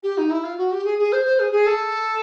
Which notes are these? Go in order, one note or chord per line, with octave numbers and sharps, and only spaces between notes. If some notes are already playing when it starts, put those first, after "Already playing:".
G4
D#4
E4
F4
F#4
G4
G#4
G#4
C5
C5
G#4
G#4
A4